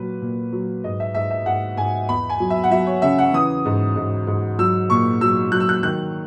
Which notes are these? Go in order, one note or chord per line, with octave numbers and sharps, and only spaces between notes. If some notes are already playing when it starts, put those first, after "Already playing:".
Already playing: A#2 F#3 B4
A#2
F#3
G#2 D#5
E5
G#2 E5
E5
G#2 F#5
G#2 G#5
E2 B5
G#5
F#3
E5
F#5
F#3 E5
C#5
C#3 E5
F#5
E3 D#6
G#2
G#2
G#2
F#3 E6
A#2 C#6
F#3 E6
F#3 F#6
E6
F#6
D#3 F#6